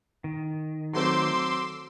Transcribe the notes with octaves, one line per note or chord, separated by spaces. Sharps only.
D#3
F#3 A3 C4 C6 D6 E6